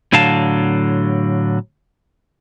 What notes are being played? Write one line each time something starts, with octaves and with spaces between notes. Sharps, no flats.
A2 D3 F#3 F5 A5